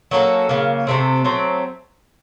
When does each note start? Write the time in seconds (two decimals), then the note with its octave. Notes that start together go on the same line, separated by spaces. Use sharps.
0.11 F#3 A#3 C#4 A4
0.49 C#3 F#3 A#3
0.87 C3 F#3 A3 C4
1.24 F#3 A3 C4